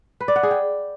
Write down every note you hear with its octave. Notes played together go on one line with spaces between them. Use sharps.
B4
D5
F#5
G#4
G5